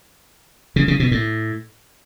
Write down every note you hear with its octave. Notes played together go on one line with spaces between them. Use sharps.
C#3
C#3
B2
A2